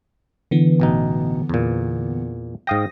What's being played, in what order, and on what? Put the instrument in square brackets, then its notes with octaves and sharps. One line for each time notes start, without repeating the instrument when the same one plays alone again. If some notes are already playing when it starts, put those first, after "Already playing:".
[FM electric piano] D3 E3 B3
[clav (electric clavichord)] A1 B2 D#4
E2 A#2
[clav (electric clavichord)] G#2 F5 G5 [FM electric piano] D#6 A#6